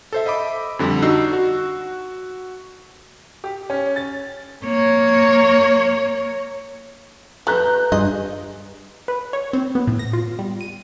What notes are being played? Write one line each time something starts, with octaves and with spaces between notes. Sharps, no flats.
A4 C5 E5
D#5 E5 B5 D6
F2 D3 G3
D4 D#4 F#4 E6 C7
F#4
G4
C#4
A6
A#3 C#5
G3 A3 B4 A#5 F#6 G6
G2 F4 G#4 D#5
B4
C#5
C4
B3
A2
A#6
F4
G3
D#7